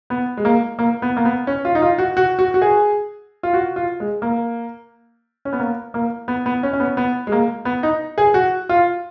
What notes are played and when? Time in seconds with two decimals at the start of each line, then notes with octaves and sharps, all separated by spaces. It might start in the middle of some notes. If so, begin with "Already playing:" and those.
0.10 B3
0.37 G#3
0.45 A#3
0.79 A#3
1.02 B3
1.17 A#3
1.25 B3
1.47 C#4
1.65 F4
1.75 D#4
1.82 F4
1.98 F#4
2.17 F#4
2.39 F#4
2.54 F#4
2.62 G#4
3.43 F4
3.54 F#4
3.76 F4
4.00 G#3
4.22 A#3
5.45 C#4
5.53 B3
5.60 A#3
5.94 A#3
6.28 B3
6.46 B3
6.63 C#4
6.73 C#4
6.80 B3
6.97 B3
7.27 G#3
7.32 A#3
7.65 B3
7.83 D#4
8.18 G#4
8.34 F#4
8.69 F4